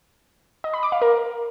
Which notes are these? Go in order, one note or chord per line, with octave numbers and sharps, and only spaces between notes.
D#5
B5
D6
F5
A#4